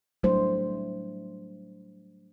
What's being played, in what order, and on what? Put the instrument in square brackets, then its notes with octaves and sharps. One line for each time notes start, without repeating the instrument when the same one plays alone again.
[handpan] F#3 G3 A3 D4 E4 C5